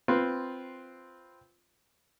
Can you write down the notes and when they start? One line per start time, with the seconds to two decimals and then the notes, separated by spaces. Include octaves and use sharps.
0.08 C4 F4 B4